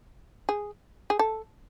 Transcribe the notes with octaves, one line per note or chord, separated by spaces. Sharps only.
G#4
G#4
A4